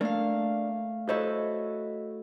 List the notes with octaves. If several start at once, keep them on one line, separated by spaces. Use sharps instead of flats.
A3 A#3 D4 F5
E4 F#4 A4 C5 C#5 D#5